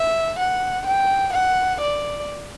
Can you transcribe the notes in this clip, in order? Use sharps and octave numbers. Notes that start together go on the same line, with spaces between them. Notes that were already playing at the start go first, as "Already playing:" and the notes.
Already playing: E5
F#5
G5
F#5
D5